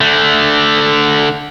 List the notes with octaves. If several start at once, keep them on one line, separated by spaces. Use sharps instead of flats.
D3 A3